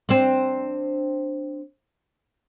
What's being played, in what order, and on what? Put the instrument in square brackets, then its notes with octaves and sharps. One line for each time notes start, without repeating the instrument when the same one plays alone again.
[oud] C4 D4